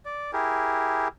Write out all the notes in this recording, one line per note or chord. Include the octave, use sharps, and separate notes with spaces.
D5
E4 G4 G#4 A#4